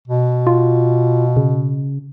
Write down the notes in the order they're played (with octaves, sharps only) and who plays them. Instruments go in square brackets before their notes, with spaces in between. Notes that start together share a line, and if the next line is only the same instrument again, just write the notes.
[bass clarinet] B2
[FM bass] F4
C#3